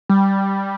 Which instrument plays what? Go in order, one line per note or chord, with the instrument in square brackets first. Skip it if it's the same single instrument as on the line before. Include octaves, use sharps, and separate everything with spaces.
[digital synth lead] G3